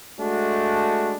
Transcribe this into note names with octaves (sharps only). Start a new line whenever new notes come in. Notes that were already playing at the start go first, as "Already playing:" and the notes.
G#3 A3 D4 F#4